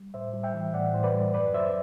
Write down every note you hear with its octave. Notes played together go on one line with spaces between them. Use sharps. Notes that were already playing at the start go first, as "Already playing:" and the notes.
Already playing: G3
A2 C5 E5
G3
E5 G5
E3
A2 D5 F#5
A2 C5
B4 D5
G3
F#2 B4 D5
F#2 C5 E5